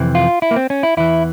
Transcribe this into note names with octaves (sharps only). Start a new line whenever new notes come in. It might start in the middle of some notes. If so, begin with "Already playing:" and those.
Already playing: F2 C3 E3
F4
E4
A#3
C4
C#4
E4
E2 E3 E4